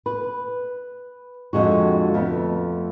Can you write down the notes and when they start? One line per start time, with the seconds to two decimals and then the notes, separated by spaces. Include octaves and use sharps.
0.06 B4
1.53 F2 D3 G#3 F#4
2.14 F2 A3 B3